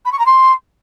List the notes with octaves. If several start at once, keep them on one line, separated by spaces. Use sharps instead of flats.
B5
C#6
A#5
C6